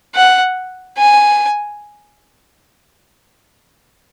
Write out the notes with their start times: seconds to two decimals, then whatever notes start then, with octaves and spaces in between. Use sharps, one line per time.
0.15 F#5
0.98 G#5